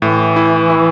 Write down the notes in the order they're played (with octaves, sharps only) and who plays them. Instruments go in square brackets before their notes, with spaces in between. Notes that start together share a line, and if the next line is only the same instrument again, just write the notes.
[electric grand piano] A2 [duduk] E3
[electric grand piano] E4
E4